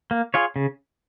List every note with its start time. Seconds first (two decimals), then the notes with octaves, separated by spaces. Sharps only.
0.11 A#3
0.34 F4 G#4 C#5
0.56 C#3